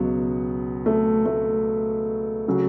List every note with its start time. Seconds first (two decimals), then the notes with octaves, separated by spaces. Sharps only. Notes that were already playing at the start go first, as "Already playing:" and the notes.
Already playing: C#2 B2 F#3 B3
0.86 A3
1.26 A3
2.48 C#3 F#3